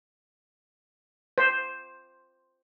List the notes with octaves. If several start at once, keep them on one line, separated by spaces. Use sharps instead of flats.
C5